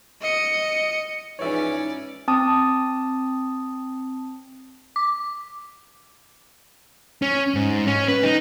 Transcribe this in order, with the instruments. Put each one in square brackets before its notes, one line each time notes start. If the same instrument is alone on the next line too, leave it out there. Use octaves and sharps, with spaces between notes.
[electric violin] D#5 C#7
[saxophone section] G#2 E3 F3 [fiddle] C#4 D5 [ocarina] D#4 [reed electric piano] C#5 E5
[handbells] C4 A5 D#6
[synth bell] D6
[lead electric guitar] C#4
G#2
C#4
B4
D#4